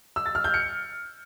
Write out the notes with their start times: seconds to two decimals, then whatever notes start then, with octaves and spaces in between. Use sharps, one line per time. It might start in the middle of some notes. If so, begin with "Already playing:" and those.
0.16 E6
0.26 A6
0.35 F6
0.44 G6
0.54 C#7